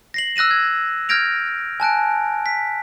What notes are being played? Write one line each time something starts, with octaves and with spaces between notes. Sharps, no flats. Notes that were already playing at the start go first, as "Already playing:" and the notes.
A#6 C7 F#7
E6 F#6 A#6 D#7 E7
G#6
F6 G6 G#6 A#6 D7 F7
G#5 A5 F#6 D7
B6